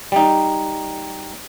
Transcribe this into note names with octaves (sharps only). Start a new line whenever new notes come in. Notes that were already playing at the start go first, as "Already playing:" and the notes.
G3 D#4